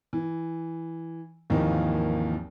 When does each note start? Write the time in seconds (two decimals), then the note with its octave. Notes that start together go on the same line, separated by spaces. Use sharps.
0.13 E3
1.50 G#1 D#2 E3 F3 A#3 D#4